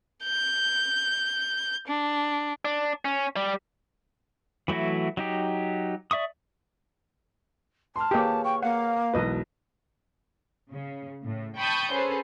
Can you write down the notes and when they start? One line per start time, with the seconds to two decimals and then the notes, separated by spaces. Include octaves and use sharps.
0.24 G6
1.88 D4
2.65 D4
3.05 C#4
3.36 G3
4.68 E3 F#3 A3 E4 F#4
5.17 F#3 D#4 G4
6.11 D5 E5 C#6 D#6
7.96 A5 C6 F6
8.11 A#3 G4 G#4 B4 C#5
8.44 G5 C#6
8.63 A#3 F5 F#5
9.14 E1 B1 E2 B4 D#5
10.70 C#3
11.22 A2
11.57 G5 A5 B5 C#6 D#6 G6
11.92 C#4 G#4 A4 B4 C5